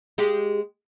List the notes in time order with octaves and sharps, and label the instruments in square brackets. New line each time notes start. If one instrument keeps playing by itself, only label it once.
[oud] G#3 G4